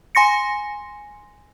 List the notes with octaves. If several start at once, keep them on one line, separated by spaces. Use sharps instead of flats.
G#5 C6 A#6 C#7